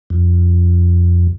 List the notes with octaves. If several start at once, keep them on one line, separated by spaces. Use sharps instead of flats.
F2